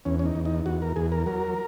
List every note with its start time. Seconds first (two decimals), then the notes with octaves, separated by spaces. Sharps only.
0.05 E2 C#4
0.19 C#4
0.26 D#4
0.35 E2
0.45 D#4
0.66 E2 F#4
0.82 A#4
0.96 E2 G#4
1.12 A#4
1.26 F#3 A#4